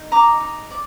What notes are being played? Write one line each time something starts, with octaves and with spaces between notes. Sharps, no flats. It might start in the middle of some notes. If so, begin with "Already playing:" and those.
Already playing: D#4
D#5 A#5 D6
D#4
D5